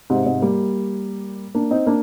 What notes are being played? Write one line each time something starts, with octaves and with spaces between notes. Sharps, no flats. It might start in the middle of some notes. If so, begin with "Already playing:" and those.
G#2 C3
G#2 C3
G3 A#3
A#3 D4
C4 D#4
A#3 D4